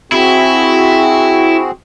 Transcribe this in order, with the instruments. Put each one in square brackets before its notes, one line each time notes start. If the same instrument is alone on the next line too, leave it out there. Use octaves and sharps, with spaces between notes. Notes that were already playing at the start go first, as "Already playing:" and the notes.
[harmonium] C4 F#4 G#4 [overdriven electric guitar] E4